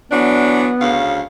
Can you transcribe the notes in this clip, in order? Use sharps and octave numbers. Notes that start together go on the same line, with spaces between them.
E3 F#3 B3 D4
D2 C#3 F5